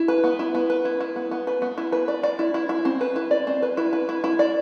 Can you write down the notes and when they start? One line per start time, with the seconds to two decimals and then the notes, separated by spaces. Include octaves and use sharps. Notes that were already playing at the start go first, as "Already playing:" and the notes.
Already playing: E4
0.08 B4
0.24 B3
0.39 E4
0.55 B3
0.70 B4
0.85 E4
1.00 E4
1.16 B3
1.31 B3
1.47 B4
1.62 B3
1.78 E4
1.92 B4
2.08 D5
2.23 D5
2.39 E4
2.54 E4
2.69 E4
2.85 C4
3.01 B4
3.16 E4
3.31 D5
3.47 C4
3.62 B4
3.77 E4
3.93 B4
4.09 E4
4.24 E4
4.39 D5